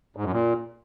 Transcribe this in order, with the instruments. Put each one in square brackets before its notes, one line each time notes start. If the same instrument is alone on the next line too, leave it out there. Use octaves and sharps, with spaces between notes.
[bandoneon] G#2
F#2
A#2